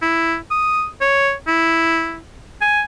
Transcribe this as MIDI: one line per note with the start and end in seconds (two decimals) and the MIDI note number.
0.02 0.36 64
0.50 0.87 87
1.01 1.33 73
1.47 2.18 64
2.61 2.83 80